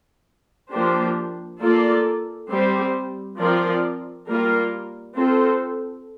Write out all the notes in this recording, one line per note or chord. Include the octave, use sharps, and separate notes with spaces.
F3 A#3 D4 G4 C5
A#3 F4 A4 D5
G3 C4 G4 C5
F3 C4 F4 A#4 D5
G3 A#3 F4 A#4
C4 F4 A4 C5